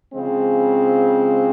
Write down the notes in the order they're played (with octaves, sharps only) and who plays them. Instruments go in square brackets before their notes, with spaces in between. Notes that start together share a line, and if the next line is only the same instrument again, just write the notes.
[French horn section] C#3 F3 G#3 C4